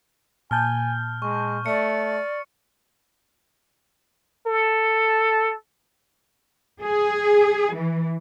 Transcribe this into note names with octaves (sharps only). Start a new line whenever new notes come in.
A#2 G#5 A5 F6 G6
G#3 C#6
A3 D5 C#7
A4
G#4
E3